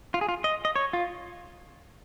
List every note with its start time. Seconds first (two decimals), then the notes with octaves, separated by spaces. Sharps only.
0.14 F4
0.21 G#4
0.29 F4
0.44 D#5
0.65 D#5
0.76 C#5
0.93 F4